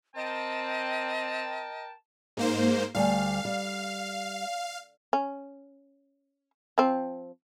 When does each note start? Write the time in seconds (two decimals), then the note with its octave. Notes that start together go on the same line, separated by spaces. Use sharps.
0.16 C4 A#4 D#5 G5 A5
2.37 G#2 A#3 C5
2.95 D2 G3 F5 G#5
3.45 G3
5.13 C#4
6.78 F3 C4